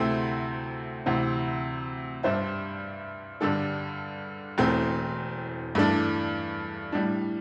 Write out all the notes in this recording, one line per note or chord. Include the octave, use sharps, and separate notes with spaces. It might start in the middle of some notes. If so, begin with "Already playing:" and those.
Already playing: D2 C3 A3 C4 E4
D2 C3 E3 C4
G2 G3 D4 C5 E5
G2 D3 G3 D4 A4
E1 E2 E3 A3 C4
G2 E3 A3 D4
A2 G3 D4